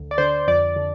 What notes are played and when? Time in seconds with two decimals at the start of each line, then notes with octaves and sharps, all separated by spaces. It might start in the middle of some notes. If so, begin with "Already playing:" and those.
Already playing: D2 D3
0.11 D5
0.18 D3 C5
0.47 F2 D5
0.76 D3